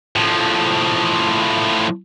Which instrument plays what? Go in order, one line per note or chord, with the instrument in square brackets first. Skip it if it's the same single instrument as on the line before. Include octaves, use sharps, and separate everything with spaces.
[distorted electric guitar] A2 F3